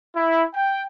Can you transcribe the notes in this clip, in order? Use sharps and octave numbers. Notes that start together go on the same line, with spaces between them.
E4
G5